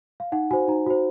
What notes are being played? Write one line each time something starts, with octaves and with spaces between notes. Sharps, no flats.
F5
D#4 F#5
F#4 C5 G#5
D#4 A#5
F#4 C5